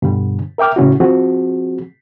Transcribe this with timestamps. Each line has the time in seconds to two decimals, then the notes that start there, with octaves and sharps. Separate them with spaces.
0.02 G2 B2 D3 G3
0.58 A#4 E5 G5 D6 F6
0.76 A2 C#3 C#4 E4 F#4
1.00 F3 C4 F#4 G#4